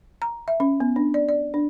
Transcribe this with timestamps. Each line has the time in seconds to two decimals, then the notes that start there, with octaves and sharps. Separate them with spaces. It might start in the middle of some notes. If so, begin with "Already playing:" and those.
0.22 A#5
0.48 E5
0.60 C#4
0.80 B3
0.96 D4
1.14 D5
1.29 D5
1.54 D4